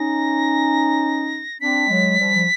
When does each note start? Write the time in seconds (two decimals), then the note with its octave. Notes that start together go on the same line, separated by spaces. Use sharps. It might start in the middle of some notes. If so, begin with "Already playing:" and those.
Already playing: C#4 D#4 A#6
1.60 C4 D4 B6
1.88 F#3 G#3
2.18 F3 G3
2.34 F3